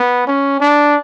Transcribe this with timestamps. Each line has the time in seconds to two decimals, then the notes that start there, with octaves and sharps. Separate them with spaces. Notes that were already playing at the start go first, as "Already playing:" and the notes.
Already playing: B3
0.27 C#4
0.60 D4